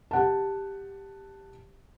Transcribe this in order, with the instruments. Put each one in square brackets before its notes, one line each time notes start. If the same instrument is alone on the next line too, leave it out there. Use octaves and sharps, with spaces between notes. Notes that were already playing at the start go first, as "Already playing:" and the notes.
[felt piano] G4 F#5 A5